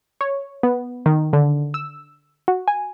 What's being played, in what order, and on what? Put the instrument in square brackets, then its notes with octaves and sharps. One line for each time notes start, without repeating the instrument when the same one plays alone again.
[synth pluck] C#5
B3
D#3
D3
E6
F#4
G#5